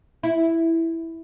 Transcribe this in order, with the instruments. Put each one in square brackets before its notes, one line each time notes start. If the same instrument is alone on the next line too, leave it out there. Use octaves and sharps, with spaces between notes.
[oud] E4